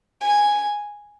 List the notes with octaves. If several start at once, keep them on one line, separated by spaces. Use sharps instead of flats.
G#5